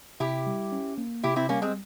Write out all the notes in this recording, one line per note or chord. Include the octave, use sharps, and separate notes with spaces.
C3 E4 G4
G3
C#4
A#3
C3 E4 G4
C4 E4
G3 A#3 C#4
G#3 C4